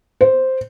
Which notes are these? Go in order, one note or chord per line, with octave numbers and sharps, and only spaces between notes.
C5